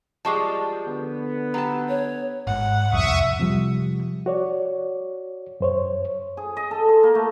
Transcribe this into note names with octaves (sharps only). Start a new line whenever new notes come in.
F3 G3 G#3 A5 C#6 D6
D3 B3
F#3 G4 A5 A#5
C#5
G#1 G#2 F#5
E1 C2 F2 E5 C#6 D#6
C3 F3 G3
F#4 C#5 D5
F#2 C5 C#5
G#4
D#5
A4
C6
A#3
A3